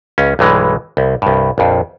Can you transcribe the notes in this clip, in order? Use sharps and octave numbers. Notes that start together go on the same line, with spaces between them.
C#2 C#4
B1 G2 E3 G#3
C2
C2 G2
A#1 F2